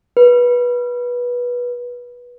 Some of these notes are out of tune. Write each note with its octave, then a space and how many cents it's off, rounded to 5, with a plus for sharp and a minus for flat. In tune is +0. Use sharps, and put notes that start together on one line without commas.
B4 -20